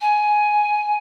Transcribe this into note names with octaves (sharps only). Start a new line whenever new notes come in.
G#5